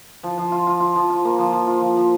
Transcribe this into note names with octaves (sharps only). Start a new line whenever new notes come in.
F3
F3
F4
F4
F4
F3
F4
A#3
F3
F3
F4
F3
F3